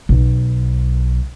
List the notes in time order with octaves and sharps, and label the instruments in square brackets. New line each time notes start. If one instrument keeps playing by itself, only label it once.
[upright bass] B1